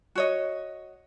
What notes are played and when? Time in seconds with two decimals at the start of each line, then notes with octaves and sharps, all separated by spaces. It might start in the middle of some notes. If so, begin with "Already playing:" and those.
0.15 F#4 C#5 D#5